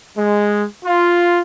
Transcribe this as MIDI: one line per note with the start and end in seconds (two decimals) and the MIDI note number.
0.17 0.64 56
0.84 1.40 65